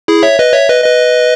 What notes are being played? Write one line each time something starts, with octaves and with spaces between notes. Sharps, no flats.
E4 G#4
C#5 E5
B4 D#5
C#5 E5
B4 D#5
B4 D#5